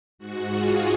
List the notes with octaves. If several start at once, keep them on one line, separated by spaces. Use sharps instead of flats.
G#2 F#4
F4 G#4